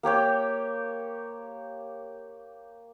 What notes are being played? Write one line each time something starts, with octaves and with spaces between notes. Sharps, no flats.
A#3 G4 C#5 G5